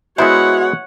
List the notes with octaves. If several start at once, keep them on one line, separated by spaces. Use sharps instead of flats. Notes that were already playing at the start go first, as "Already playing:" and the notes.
G#3 B3 E4 F#4 C5 C#5 F#5